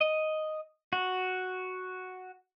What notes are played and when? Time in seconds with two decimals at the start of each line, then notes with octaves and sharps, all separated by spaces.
0.01 D#5
0.93 F#4